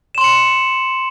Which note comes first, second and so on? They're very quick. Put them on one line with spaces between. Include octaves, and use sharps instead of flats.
E7 C6 F#7 C#7